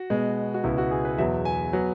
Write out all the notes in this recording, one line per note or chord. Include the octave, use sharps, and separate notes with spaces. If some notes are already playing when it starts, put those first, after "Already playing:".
Already playing: F#4
B2 G#3 B3
F#4
C#2 B2 B3 E4
F#4
G#4
B4
E2 B2 F#3 B3 E5
G#5
F#3 B3